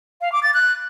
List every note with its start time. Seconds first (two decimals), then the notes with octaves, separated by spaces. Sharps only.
0.21 F5
0.32 D6
0.43 A6
0.54 F#6